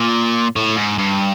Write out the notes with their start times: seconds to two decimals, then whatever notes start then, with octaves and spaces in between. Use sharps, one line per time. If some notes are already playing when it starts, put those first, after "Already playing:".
Already playing: A#2
0.56 A2
0.76 G#2
0.98 G2